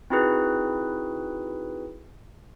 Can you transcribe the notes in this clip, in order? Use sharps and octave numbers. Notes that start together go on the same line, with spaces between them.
C4 D#4 E4 F#4 G#4 B4